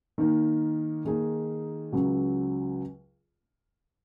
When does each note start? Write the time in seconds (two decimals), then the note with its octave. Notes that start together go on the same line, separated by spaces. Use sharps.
0.18 D#3 A#3 D#4
1.05 D#3 A#3 D#4 G#4
1.92 C#2 C#3 F#3